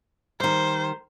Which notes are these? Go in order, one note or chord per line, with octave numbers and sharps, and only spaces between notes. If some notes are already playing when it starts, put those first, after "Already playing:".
D#3 G3 C5